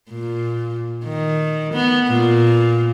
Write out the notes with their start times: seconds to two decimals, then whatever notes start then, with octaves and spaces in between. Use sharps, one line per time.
0.10 A#2
1.05 D#3
1.74 B3
2.08 A#2